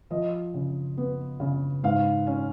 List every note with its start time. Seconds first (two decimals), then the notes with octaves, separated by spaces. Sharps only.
0.10 F3 D#5
0.54 C#3
0.97 B3
1.40 C#3
1.83 G#2 F5
2.27 C#4